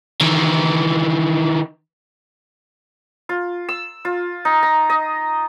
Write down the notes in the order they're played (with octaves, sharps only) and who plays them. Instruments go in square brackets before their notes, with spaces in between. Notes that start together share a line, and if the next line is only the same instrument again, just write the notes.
[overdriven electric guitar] D#3 E3
[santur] F4
E6
F4
D#4
A#5
D#5